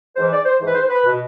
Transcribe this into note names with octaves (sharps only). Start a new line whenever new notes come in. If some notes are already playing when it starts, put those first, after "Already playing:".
G#2 E3 C5
D5
C5
G#2 E3
B4
C5
B4
B2